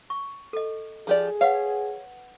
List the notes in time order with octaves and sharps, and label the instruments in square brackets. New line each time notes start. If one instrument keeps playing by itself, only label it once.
[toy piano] C#6
A4 D#5
[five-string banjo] F3 G4 D5 [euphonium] G#4
[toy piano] B4 F#5 [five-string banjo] C#5 F5